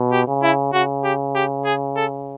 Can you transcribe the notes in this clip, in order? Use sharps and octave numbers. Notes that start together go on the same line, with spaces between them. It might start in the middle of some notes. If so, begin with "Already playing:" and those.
Already playing: B2
G4
C#3
E4
C#3 F#4
G4
G4
G#4
A4